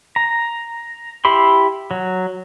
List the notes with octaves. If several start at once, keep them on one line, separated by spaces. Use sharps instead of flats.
A#5
E4 G4 B5 C6
F#3